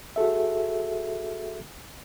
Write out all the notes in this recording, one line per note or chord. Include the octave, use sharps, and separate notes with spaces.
F#4 G#4 A4 E5